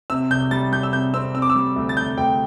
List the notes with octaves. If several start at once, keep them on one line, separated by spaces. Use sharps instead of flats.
C3 E6
C2 G6
G3 A6
G3 G6
E6
C3 G6
C4 E6
C3 E6
D6
E6
G3
D2
A6
C3 G6
D2 G5